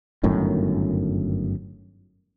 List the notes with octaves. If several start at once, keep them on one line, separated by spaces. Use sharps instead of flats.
G1 F#2 A2 D#3